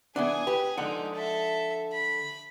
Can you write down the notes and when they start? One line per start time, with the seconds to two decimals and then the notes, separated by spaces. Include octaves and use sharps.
0.16 E3 B3 D4 G#4 G#5
0.47 G4 B4
0.77 D3 F3 G#3 D#4 F#5
1.14 A4 E5
1.92 B5